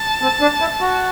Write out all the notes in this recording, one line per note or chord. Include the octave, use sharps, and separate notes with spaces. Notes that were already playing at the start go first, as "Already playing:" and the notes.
Already playing: A5
C4
D4
E4
F#4